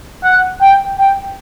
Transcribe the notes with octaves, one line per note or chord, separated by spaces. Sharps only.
F#5
G5
G5